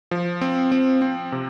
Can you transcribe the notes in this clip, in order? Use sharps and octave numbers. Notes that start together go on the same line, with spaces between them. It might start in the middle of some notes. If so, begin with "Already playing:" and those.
F3
C4
C4
C4
C3